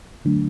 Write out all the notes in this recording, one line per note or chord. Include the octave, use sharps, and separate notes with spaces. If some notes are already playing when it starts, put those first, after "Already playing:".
D3 F#3 A3 D4